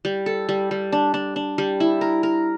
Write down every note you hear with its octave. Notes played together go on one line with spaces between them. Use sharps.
G3
A4
G3
G3
D4
D4
D4
G3
E4
A#4
A#4